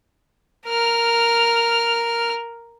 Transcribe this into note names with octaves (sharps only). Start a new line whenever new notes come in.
A#4 F6